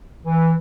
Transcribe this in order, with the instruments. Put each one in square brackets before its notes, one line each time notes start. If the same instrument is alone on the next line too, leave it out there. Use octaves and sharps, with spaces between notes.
[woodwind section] E3